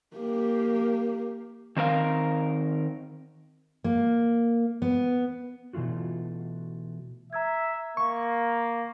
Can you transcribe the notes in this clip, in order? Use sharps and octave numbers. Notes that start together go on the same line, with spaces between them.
A#3 G4
D#3 C4 A#4 F5
A#3
B3
B2 E3 A3 F4 F#4
E5 A#5 E6 G#6
A#3 C#6